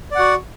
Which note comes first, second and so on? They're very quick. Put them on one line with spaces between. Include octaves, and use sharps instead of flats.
D5 F#5 F#4